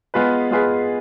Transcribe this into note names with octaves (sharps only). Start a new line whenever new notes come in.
G#3 B3 F4 G#4 B4
G#3 B3 F4 G#4 B4